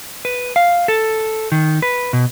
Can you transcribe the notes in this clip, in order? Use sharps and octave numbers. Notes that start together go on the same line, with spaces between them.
B4
F5
A4
D#3
B4
B2